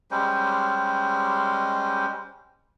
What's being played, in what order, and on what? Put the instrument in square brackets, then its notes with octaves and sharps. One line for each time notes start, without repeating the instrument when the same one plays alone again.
[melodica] G3 G#3 C#4 C5